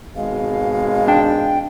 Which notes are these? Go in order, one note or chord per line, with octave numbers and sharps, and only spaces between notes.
G#1 B2 G#3 F5
D4 G5 A5